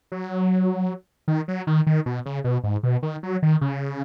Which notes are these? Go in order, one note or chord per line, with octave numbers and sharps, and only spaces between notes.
F#3
D#3
F#3
D#3
D#3
B2
C#3
B2
G#2
B2
D#3
F#3
D#3
C#3